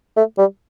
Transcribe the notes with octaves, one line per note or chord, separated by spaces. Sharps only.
A3
G3